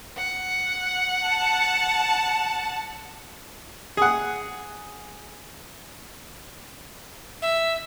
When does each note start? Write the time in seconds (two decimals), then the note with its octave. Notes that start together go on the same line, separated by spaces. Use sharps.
0.17 F#5
1.27 A5
3.97 G#4 F#5
7.42 E5